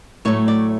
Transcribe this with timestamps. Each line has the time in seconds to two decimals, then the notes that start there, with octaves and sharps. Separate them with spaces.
0.25 A2 F#3 A3 C#5
0.48 D5